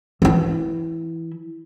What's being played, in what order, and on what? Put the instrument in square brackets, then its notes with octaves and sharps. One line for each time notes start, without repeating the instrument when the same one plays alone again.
[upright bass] E3 E4